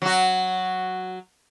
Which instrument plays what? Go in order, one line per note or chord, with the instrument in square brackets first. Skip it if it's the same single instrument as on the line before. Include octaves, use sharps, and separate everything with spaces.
[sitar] F#3 F#4